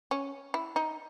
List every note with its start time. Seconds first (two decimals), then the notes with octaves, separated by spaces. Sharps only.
0.11 C#4
0.54 E4
0.76 D#4